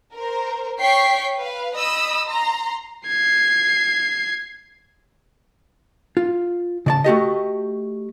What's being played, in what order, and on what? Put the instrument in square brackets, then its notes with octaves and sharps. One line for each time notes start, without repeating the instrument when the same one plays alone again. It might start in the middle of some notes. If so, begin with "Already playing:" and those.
[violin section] A#4 C5
C#5 G5 C#6 B6 C7
B4 F5
D#5 B5 D#6 E6
A#5 C6
[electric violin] G#6 C7
[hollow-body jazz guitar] F4
C#3 D5 A5
A3 F#4 G4 D#5